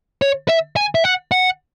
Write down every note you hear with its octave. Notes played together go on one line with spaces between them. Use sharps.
C#5
E5
G#5
E5
F#5
F#5